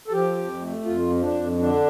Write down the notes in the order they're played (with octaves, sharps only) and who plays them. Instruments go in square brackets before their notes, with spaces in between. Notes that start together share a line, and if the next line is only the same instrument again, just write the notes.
[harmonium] A4
F3 G4
F2
A3
F2 F4
F3
D4
F2
D3 D4